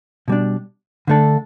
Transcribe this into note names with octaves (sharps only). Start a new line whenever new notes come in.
B2 G3 D4
D3 A3 D4 A4